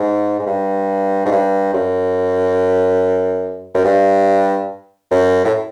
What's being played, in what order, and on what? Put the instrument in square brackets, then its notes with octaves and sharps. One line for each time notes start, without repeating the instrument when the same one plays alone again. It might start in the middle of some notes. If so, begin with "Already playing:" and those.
Already playing: [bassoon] G#2
G#2
G2
G#2
G2
F#2
F#2
G2
F#2
A2